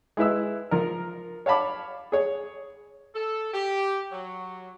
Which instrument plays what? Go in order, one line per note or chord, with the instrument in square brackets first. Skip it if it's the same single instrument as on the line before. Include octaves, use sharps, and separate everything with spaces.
[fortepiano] G#3 E4 B4 E6
F3 A#4
C#5 F5 A5 B5 D6
G#4 C#5
[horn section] A4
G4
F#3